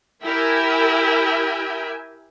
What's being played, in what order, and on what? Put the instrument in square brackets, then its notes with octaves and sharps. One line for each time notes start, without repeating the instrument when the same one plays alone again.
[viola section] E4 G4 A#4 E5 G5 G#5